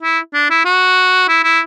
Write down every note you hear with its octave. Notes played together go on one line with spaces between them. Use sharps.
E4
D4
E4
F#4
E4
E4